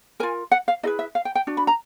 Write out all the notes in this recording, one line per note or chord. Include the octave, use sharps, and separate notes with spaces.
F4 A#4 G#5
F#5
F5
E4 G#4 B4 D#5
E5
F5
G5
G5
D4 F#4
B5
A#5